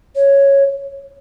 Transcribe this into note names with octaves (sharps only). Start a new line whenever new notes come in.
C#5